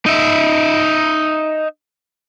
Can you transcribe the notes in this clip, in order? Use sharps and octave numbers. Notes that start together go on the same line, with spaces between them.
D#4 E5